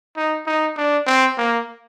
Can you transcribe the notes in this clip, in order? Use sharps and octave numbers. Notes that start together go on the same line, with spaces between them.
D#4
D#4
D4
C4
A#3